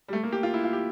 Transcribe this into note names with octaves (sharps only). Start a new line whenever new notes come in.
G3
A3
A#3
G4
F4
E4
F4
G4